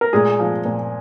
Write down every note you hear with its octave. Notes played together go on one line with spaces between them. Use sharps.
A#4
A#2 G#3 G#4
F3
A#2